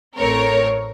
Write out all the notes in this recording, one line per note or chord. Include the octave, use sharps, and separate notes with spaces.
A1 A2 A3 C4 A#4 C#5